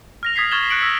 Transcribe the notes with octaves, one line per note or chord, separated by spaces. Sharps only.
F6 A#6 F7
D#6 G#6 B6 C7
C#6 F6 G#6 A6 E7 G7
F#6 C#7 D7 F#7
E6 A#6 B6